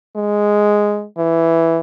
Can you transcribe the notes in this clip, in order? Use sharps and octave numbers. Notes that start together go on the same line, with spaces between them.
G#3
E3